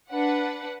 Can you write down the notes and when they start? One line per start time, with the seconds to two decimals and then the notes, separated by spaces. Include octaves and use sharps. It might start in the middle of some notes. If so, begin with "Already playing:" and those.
0.11 D4 B4 F#5